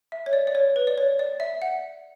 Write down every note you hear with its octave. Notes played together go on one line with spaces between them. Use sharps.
E5
C#5
D5
D5
C#5
B4
D5
C#5
D5
E5
F#5